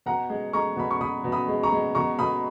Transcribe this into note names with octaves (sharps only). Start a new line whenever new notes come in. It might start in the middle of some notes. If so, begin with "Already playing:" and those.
B2 F#5 A#5
G#3
G#3 A#5 C#6
B2 B5
C#6
B2 B5 D#6
B2
B5 D#6
G#3
A#5 C#6
G#3
B2 A#5 C#6
B2 B5 D#6